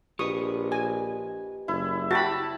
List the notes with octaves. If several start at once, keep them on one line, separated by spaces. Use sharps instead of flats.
A#1 G4 B4 D#5 C#6 D#6
G#5
F#1 E4
F#4 G4 A5 B5